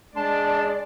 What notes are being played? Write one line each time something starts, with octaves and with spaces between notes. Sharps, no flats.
G#3 D4 D5 A5 C6